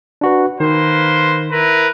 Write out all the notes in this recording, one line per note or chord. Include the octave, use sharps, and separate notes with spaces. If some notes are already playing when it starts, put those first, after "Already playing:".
D4 F#4 B4
D#3 A#3 B4 C5
E4 A#4 B4